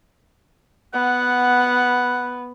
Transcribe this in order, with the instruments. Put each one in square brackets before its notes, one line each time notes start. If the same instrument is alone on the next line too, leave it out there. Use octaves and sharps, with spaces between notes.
[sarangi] B3 [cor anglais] F#5